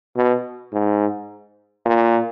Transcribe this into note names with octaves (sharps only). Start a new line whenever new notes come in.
B2
G#2
A#2